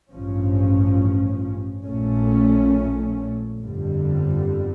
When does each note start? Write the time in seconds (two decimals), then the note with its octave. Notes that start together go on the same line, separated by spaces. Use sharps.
0.10 A1 G2 F3 C#4
1.85 A#1 A#2 A3 C#4
3.59 G1 F2 D3 G3